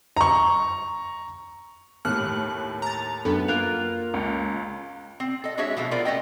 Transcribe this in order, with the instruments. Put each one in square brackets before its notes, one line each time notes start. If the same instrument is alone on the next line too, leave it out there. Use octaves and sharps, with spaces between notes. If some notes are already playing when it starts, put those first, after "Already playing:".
[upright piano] A#5 C#6
[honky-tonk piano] D#2 A2 [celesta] F6 [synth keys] F#6
[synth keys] A#5 A6
[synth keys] F#2 B3 [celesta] D4 A4
[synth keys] A#3 F4 A#4 [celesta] F#6 F7
[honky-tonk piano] C#2
[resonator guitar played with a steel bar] C4
A4 D#5
G#3 D4 F#4 G#4 C#5 E5
B2 F3 A3 A#3
B3 F4 A#4 C5 D5
A3 C#4 D#5 G5